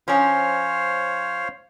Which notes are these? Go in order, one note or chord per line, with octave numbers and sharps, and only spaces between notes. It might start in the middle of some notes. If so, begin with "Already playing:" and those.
F3 C#4 C5 C#5 F5